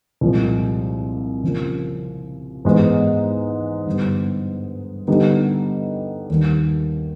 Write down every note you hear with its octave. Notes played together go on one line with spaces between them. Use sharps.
C2 A#2 F3 G#3
C#3 F3 A#3 C#4
G#2 E3 G#3 B3 D#4
G2 D3 G3 B3
D3 G3 B3 D#4
D#2 D#3 G3